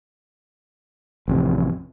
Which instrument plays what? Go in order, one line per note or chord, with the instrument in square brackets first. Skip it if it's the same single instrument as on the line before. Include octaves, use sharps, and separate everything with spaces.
[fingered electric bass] A1 F2 C3